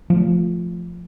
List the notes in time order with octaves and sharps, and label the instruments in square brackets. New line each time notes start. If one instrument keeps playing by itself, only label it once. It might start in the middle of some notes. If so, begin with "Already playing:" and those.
[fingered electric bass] F3 A3